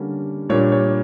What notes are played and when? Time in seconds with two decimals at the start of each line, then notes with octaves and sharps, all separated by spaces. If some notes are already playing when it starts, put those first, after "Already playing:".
Already playing: D3 G3 A#3 C#4
0.49 A#2 G3 D4 C#5
0.72 C#5